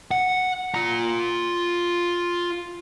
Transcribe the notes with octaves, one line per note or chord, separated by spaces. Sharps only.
F#5
F4 A#5